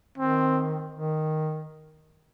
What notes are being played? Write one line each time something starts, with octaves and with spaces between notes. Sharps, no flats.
D#3 C4
D#3